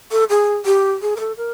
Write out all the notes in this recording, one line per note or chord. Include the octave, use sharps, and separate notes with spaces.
A4
G#4
G4
G#4
A#4
A4
A#4